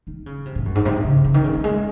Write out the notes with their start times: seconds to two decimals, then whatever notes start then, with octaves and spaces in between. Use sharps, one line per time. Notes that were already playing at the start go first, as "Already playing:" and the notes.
0.07 D#3
0.26 C#3
0.46 C3
0.55 A2
0.66 F#2
0.75 G#2
0.85 C3
1.04 C#3
1.24 C#3
1.34 D#3
1.44 C#3
1.54 F#3
1.64 G#3